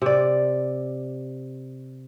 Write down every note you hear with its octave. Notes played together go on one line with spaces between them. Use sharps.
C3 D5